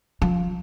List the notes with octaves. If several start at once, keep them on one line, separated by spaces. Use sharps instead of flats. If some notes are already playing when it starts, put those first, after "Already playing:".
F3